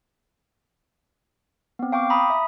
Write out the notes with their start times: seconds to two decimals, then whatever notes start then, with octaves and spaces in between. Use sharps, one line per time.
1.79 B3 C4
1.92 F5 G5 C#6 D6
2.10 A#5 B5 D#6
2.30 E5